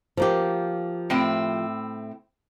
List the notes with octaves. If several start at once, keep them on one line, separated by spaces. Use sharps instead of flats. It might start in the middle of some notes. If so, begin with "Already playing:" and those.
F3 A#3 G4
A2 C4 E4